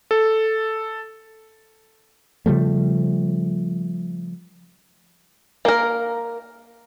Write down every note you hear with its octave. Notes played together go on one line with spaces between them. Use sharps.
A4
C#3 F3 G3 A3
A#3 A#4